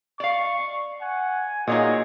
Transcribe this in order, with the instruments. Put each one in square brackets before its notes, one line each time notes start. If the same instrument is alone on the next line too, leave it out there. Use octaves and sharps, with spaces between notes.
[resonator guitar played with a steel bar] D5 F5 [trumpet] C#6
[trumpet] F#5 [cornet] G#5
[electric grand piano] A#2 F4 [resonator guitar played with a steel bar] D#4 C#5 D#5 [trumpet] F#4 [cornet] G#4